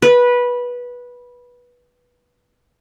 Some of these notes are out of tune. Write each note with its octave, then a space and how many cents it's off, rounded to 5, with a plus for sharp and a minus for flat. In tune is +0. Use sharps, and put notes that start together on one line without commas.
B4 -15